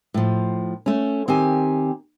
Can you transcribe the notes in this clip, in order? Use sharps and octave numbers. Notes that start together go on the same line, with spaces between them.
A2 F3
A3 C#4
D#3 C4 G4 G#5